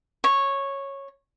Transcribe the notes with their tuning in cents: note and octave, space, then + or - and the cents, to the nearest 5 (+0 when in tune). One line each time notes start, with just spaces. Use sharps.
C#5 -10